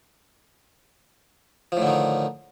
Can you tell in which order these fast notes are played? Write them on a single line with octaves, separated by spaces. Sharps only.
F3 A2 D3 D#3